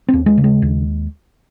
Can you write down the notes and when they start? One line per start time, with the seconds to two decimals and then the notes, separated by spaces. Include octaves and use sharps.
0.08 D#2 C4
0.26 G#3
0.38 C#3
0.44 G#3
0.62 D#2